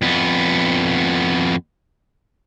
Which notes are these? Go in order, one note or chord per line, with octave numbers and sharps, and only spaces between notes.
F2 B3